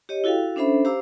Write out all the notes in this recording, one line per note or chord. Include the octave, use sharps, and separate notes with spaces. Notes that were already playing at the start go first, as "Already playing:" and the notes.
G4 C#5 D#5
E4 F#4 A4 F5 G5
C#4 D4 A4 C5 E5 B5
G4 C5 F5 A#5 D6 E6